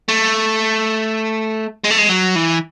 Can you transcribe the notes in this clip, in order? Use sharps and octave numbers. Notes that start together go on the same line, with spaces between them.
A3
G#3
A3
G#3
F#3
E3